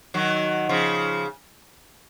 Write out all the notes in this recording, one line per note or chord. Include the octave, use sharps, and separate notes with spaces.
D#3 F#3
C#3 F3